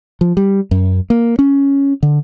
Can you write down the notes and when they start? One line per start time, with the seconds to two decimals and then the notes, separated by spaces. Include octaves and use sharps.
0.21 F3
0.37 G3
0.71 F#2
1.10 A#3
1.39 C#4
2.03 D3